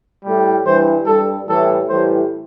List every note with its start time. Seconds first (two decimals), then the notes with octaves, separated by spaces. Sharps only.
0.25 A2 G3
0.65 G2 E3 G3 C5
1.06 G2 G3 A4
1.48 A2 E3 G3 A4
1.89 A2 E3 G3 C5